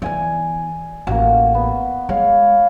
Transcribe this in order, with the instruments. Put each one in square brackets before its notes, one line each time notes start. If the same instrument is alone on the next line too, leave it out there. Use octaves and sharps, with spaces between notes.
[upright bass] E3 B3 [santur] D5 G#5
[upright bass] A1 [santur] A#3 F#4
[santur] B3
[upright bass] G#3 [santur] C#5 F5